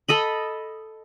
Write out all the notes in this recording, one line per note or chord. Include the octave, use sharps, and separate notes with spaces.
A4 D#5 B5